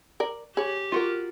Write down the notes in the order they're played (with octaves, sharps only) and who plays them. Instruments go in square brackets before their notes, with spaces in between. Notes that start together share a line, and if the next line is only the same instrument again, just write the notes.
[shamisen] A#4 D5
[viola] G4 [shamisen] G#4 C#5
[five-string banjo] F4 F#4 A#4